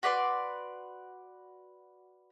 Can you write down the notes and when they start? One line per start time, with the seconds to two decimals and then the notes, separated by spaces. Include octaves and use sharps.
0.03 F#4 B4 D5 C6